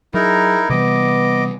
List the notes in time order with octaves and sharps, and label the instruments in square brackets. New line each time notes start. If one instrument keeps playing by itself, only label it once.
[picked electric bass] F#3 [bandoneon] D#4 E4 A#4 [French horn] G#4
[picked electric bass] C3 E3 G3 [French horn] B3 [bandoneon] D#5 D6